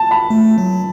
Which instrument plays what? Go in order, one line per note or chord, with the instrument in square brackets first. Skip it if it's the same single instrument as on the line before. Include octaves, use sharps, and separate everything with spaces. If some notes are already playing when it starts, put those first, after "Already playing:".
Already playing: [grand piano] A5
B5
[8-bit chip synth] A3
F#3